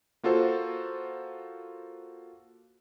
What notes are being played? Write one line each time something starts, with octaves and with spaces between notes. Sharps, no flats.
A#3 F4 F#4 A4 C5